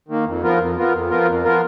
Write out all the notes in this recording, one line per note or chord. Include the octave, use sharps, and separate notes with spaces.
D#3 A#3
F2
F3 B3 F4 A#4
F2
F3 B3 F4 A#4
F2
F3 B3 F4 A#4
F2
F3 B3 F4 A#4